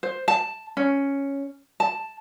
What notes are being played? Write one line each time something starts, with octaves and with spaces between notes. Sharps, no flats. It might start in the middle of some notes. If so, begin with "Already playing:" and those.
C5
A5
C#4
A5